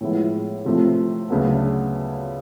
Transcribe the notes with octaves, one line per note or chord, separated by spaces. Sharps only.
A2 F3 G#3 B3 E4
C3 F3 A3 C4
D2 C#3 F#3 B3